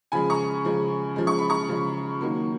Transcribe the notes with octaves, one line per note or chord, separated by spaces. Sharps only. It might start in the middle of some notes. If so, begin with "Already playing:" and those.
C#3 F3 G#3 G#5 B5
A#5 C#6
C#3 F3 G#3
C#3 F3 G#3
C#6
B5
A#5 C#6
C#3 F3 G#3
D#3 F#3 A#3